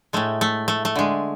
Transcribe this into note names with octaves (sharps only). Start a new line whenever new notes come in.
A2 G#3 A3
A3
A3
A3
D3 G#3